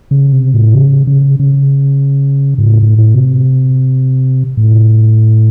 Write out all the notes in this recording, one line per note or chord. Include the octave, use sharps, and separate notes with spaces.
C#3
C3
A2
C#3
C#3
C#3
G#2
A2
A2
A2
C3
A2